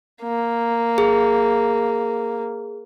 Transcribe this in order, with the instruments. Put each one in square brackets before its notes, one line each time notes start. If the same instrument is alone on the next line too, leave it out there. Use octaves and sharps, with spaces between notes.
[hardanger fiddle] A#3
[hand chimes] G#4